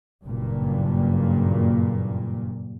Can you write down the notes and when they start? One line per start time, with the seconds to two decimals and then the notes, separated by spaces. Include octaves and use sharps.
0.24 F#1 G2 A#2